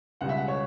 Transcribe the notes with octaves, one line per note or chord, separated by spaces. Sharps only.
C#2 B2 G3 F#5
E5
F#5
C#5